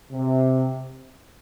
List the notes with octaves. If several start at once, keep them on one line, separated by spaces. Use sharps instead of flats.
C3